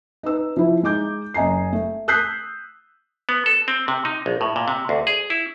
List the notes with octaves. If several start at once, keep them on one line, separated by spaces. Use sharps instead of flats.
D#4 B4 E6
F3 E4
G#3 D#4 D6 G6
F#1 D#5 G#5 A#5 C7
A3
D#6 E6 F#6 G6 B6 C7
B3
A4
C4
C3
D#4
A#1
A2
A#2
C3
D2
G#4
E4